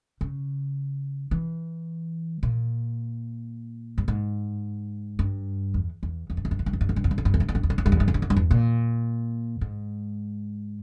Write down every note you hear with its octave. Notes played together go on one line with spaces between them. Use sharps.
C#3
E3
A#2
G2
G#2
G2
E2
E2
E2
G2
E2
G2
E2
G2
E2
G2
E2
G2
E2
G2
E2
G2
E2
G2
E2
G2
E2
G2
E2
G2
E2
G2
E2
G2
E2
G2
E2
A#2
G#2